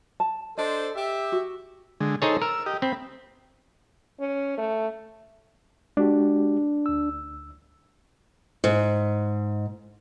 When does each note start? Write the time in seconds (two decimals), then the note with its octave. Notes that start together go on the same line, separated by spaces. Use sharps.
0.20 A5
0.57 D4 A4 C5 D#5
0.95 G4 E5
1.32 F#4
2.00 D3 G#3
2.22 D#4 G#4 A4 C5 C#5
2.42 A#4 E6
2.66 G4 D#5
2.82 C4 B5
4.20 C#4
4.58 A3
5.97 G#3 D4 F#4 G4
6.86 D2 E6
8.64 G#2